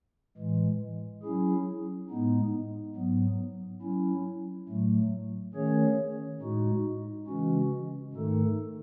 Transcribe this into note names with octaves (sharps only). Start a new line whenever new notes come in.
A2 E3 G#3
F#3 C#4 E4 G#4
A2 G#3 B3 D#4
G#2 F#3 B3
F#3 C#4 E4
A2 F#3 A3
D#3 A3 C#4 G#4 C#5
A2 G#3 D#4 F#4
C#3 E3 G#3 C#4 F#4
G#2 D#3 A3 D#4 A4